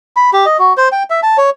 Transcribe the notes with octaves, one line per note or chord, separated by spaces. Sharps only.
B5
G4
D#5
F#4
C5
G5
E5
A5
C#5